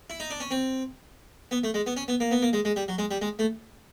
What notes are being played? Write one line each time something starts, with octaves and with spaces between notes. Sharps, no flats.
E4
D#4
D4
C#4
C4
B3
A3
G#3
B3
C#4
B3
A#3
B3
A#3
G#3
G#3
G3
F#3
G#3
G3
G#3
A3